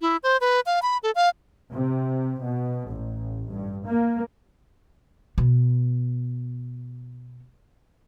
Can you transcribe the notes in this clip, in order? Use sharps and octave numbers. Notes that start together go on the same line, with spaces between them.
E4
C5
B4
F5
B5
A4
F5
C3
B2
A1
G2
A#3
B2 B3